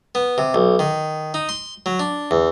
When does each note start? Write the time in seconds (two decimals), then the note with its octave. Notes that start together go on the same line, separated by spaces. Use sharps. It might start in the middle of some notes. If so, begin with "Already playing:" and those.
0.15 B3
0.38 C3
0.54 B1
0.79 D#3
1.34 D#4
1.49 C6
1.86 F#3
2.00 D4
2.31 E2